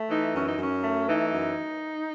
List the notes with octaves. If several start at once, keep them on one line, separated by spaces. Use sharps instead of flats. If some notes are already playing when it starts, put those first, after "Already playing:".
Already playing: A3
E3 D#4
F#2 C#4
D#4
F#2 C#4
A3
E3 D#4
F#2